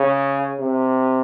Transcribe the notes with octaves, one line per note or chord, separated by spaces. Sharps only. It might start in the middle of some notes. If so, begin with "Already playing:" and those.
Already playing: C#3
C3